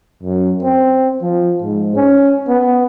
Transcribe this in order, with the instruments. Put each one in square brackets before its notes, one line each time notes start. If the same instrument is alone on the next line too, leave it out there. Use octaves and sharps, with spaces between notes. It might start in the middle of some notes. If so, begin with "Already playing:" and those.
[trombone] F#2
C4
F3
G#2
C#4
B3